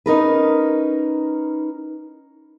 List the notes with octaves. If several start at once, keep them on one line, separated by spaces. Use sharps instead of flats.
C#4 D#4 A#4 B4